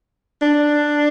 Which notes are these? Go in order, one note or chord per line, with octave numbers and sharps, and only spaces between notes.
D4